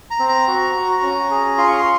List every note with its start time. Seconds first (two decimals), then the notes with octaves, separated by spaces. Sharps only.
0.11 A#5
0.20 C4
0.29 A#5
0.47 F#4
0.75 F#4
1.02 C#4
1.31 G#4
1.58 F4 C6
1.67 C#6
1.78 C6